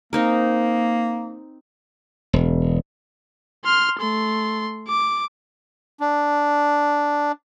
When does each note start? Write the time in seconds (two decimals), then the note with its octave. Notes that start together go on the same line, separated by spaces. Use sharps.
0.13 A#3 C4 D#4 A#4
2.33 E1
3.65 C6 F6
3.99 A3 C6
4.88 D6
6.00 D4